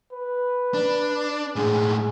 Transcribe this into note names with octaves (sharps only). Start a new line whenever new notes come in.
B4
D4
A2 G#3 G#4